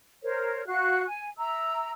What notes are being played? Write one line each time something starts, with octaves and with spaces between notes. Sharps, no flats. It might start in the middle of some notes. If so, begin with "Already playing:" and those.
A#4 C5 C#5
F#4 F5 F#6
G#5
E5 A#5 E6